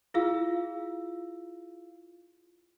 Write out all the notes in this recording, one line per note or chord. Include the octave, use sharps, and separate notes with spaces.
E4 F4 G#4 F5 E6